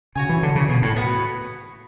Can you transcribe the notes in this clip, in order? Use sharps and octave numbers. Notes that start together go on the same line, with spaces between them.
C#3 F#4 C#5 G#5
E3
D3
C#3
B2
A2
B3 F#4 B4